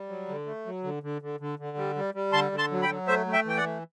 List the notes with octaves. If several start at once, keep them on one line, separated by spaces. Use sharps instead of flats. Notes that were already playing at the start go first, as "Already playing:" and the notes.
Already playing: G3
F#3
D3
A3
F#3
D3
D3
D3
D3
D3
G3
G3
G3
D3 A5 C6
D3
A5 C6
F#3
G5 B5
F#3
A3 C5 E5
A3
E5 G5
E3 G5
D5 F#5
A3